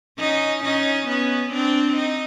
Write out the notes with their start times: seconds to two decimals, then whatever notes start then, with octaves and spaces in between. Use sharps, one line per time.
0.18 C#4 D#4
0.63 C#4 D#4
1.07 B3 C#4
1.52 C4 D4
1.97 D#4